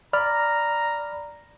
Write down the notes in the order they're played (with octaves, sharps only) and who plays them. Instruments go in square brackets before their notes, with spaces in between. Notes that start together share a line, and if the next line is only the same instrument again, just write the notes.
[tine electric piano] D5 B5 F6 [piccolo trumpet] A#5